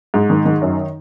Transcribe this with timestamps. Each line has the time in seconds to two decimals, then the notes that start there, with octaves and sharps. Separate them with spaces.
0.14 G#2
0.30 D#3
0.45 D#3
0.61 F#2